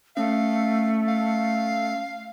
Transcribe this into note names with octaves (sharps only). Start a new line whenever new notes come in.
A3 C#4 F5
F5